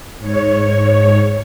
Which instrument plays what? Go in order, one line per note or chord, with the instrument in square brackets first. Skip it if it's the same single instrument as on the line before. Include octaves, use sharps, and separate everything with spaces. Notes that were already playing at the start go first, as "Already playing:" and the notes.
[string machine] G#2 C#5